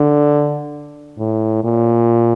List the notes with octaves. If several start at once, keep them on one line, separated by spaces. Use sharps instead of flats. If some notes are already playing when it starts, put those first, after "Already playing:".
Already playing: D3
A2
A#2